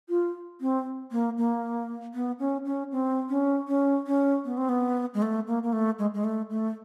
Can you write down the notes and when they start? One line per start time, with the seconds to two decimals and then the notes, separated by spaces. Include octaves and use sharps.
0.09 F4
0.61 C4
1.12 A#3
1.38 A#3
2.14 B3
2.39 C#4
2.65 C#4
2.92 C4
3.30 C#4
3.68 C#4
4.07 C#4
4.45 B3
4.57 C4
4.69 B3
5.14 G#3
5.22 A3
5.47 A#3
5.63 A#3
5.73 A3
5.99 G#3
6.14 G#3
6.24 A3
6.50 A3